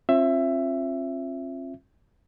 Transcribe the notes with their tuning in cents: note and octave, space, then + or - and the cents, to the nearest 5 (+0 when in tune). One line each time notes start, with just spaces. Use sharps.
C4 +45 F4 +0 E5 +15